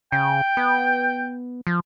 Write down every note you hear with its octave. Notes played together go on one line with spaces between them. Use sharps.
C#3 G5
B3
F3